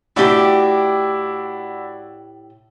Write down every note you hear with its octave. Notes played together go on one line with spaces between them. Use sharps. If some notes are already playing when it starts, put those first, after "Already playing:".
A2 D4 E4 F#4 G4